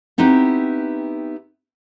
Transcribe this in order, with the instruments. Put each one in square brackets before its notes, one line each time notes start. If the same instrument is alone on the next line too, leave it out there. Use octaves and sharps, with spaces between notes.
[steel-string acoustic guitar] B3 C4 D#4 E4 G4 B4